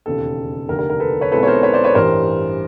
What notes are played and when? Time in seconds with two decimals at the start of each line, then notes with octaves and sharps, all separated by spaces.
0.06 E1 D#2 C#3 A4
0.69 F1 D#2 D3 A#4
0.79 A#4
0.90 A#4
1.00 A4 B4
1.21 B4 C#5
1.32 B1 B2 G#3 C4 E4 A4 B4
1.43 C#5
1.47 A#4 C5
1.63 B4 C#5
1.73 C5 D5
1.84 B4 C#5
1.94 A1 G2 E3 G3 A#4 C5